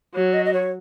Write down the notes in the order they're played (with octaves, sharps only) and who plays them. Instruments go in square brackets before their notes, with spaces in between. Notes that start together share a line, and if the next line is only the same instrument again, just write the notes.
[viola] F#3 [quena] C#5
[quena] D#5
D#5
C#5